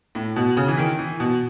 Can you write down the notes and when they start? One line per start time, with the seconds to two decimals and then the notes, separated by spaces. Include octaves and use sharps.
0.15 A2
0.36 B2
0.57 C#3
0.68 E3
0.78 D#3
0.99 E3
1.20 B2